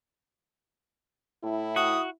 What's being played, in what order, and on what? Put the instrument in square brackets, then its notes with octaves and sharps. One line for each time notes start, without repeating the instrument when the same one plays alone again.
[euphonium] A2 [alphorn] E4
[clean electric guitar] F#4 [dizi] D#6